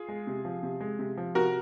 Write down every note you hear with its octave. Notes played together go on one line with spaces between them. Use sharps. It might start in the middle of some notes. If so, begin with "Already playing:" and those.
Already playing: F4 G#4
G#3
C3
F3
C3
G#3
C3
F3
C3 F#4 A#4